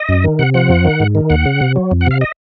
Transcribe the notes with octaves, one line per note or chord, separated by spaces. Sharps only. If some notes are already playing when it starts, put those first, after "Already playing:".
Already playing: D#5
F#2
D#3
C3 F#5
F3 F#5
F2
D#3
G#2
D#3
D#2 F#5
C#3
C3
F#3
F2
F#5
C3 F5
D#5